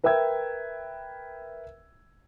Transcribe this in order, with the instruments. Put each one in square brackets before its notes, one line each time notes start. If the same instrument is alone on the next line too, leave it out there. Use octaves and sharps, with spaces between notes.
[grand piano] A#4 B4 E5 G5 E6 G#6